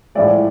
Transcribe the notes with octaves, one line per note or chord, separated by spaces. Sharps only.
A2 F3 G#3 D5 E5